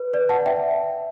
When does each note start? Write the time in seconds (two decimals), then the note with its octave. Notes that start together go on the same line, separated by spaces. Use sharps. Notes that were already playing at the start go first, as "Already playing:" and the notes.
Already playing: B4
0.13 B4 D5
0.29 F#5 A5
0.46 E5 G5